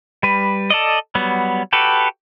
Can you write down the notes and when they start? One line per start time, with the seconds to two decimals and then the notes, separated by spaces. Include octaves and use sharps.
0.23 G3 B4
0.70 A4 D5 D#5
1.15 F#3 G3 B3
1.73 F#4 G4 A4 B4